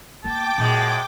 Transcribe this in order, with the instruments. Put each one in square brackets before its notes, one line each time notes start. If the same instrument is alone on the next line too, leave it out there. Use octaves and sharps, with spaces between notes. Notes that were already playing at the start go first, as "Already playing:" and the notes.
[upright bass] A#3 B3 [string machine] G5 D6 [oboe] A5
[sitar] F#2 G#3 [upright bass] A#2